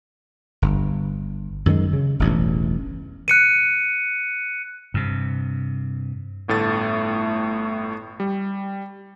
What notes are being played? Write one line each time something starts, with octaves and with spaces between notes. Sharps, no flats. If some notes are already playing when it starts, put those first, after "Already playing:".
G1
F#2 D#3 F#3 G#3
C#3
E1 A1 G2
F#6 C#7 D#7
G2 C3
G1 A2 A3 A6
G3